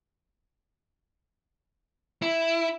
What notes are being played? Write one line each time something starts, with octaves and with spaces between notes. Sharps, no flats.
E4